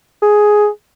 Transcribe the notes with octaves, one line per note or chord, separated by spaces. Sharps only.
G#4